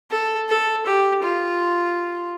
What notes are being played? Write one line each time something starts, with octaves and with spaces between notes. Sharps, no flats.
A4
A4
G4
F4